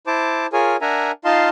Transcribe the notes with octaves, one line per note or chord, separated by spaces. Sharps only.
E4 C5 A5 D6
F4 G#4 A#4 C#5 G#5
D4 A#4 E5 F#5 G#5 A#5
D#4 F4 D#5 F5 A5 C6